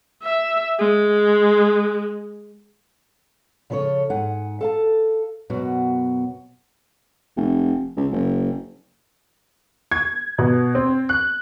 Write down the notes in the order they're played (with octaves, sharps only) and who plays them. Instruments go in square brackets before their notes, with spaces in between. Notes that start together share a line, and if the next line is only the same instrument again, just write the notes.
[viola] E5
G#3
[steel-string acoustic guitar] C#3 F3 A4 C5 C#5
G#2 F#5 G#5
A4 F5 A5
F#2 B2 F#4
[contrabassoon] F1
C#2
F#1
[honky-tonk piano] G#6
B2
C4
F#6